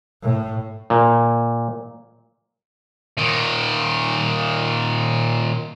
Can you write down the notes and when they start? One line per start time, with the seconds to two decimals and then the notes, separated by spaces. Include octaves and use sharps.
0.22 A2
0.90 A#2
3.17 A#2 D#3